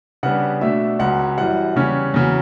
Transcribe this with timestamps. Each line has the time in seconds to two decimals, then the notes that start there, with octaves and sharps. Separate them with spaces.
0.23 C#3 G3 B3 D4 F#5
0.61 B2 A3 D4 E5
0.99 C#2 C#3 F#3 F#5
1.38 F#2 E3 G3 F#5
1.76 E2 C#3 G3 C#4
2.14 E2 C#3 F#3